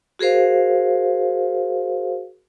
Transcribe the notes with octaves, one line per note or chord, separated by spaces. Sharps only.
F#4 G#4 A#4 C5 F5